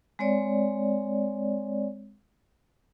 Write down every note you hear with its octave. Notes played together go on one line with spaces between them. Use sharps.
G#3 C4 C#5 D5